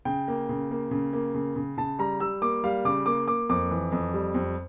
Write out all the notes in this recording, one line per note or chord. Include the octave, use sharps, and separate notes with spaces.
C#3 G5
A#3
C#3
A#3
C#3
A#3
C#3
C#3
C#3 A5
G3 A#5
G3 E6
A#3 D6
G3 F5
C#3 D6
A#3 D6
A#3 D6
F2 D6
E3
F2
G3
F2